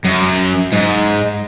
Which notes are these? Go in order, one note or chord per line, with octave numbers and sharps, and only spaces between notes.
F#2
G#2